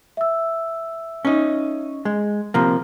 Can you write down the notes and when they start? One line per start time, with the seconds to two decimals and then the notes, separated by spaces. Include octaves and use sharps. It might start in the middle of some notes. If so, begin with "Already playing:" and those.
0.17 E5 E6
1.25 C#4 D#4
2.05 G#3
2.54 C3 F3 A#3 A#5